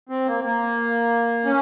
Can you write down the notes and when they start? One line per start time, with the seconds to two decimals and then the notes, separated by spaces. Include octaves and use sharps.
0.09 C4
0.26 A#3
0.44 A#3
1.45 C#4